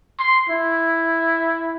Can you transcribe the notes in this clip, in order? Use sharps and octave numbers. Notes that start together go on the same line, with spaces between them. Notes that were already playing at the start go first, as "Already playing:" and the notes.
C6
E4